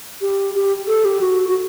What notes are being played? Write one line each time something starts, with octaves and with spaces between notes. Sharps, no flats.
G4
G4
A4
G4
F#4
F#4